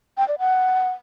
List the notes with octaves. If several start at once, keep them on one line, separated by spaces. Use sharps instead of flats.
G5
D5
F#5